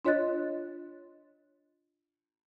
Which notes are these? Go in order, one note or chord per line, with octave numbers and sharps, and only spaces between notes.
D4 F4 C#5 D#5 F#6 A6